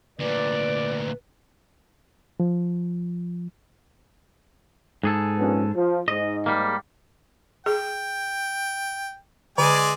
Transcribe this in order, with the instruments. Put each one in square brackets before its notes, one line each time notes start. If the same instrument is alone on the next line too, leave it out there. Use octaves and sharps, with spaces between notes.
[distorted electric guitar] D2 A#2 [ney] B4 [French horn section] D5
[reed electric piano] F3
[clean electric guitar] G#2 G#4 A4
[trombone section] A#1 B3 C#4
F3
[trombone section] G#2 [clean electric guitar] D#5
[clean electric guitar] G3 A#3
[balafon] G#4 [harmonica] G5
[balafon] D3 [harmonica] G#3 D5 G#5